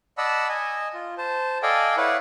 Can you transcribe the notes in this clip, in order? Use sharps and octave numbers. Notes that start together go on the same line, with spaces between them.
D5 D#5 F#5 A5 B5 E6
D#5 G#5
F4
C5 A5
A4 D5 D#5 F5 G5 G#5
E4 B4 C#5 D5 F5 F#5